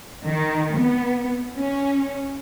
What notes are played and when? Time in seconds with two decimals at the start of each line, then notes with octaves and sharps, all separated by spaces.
0.25 D#3
0.78 B3
1.55 C#4